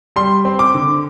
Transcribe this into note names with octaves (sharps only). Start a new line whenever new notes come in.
G3 C6
C4
D6
D3